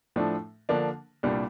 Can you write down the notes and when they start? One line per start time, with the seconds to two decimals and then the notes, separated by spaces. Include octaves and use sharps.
0.16 A2 F3 A3 D4
0.69 D3 F3 A#3 D4
1.23 C2 A#2 G3 D4